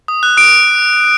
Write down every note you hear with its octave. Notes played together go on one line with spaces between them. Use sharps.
D#6
F#6
D#6 D7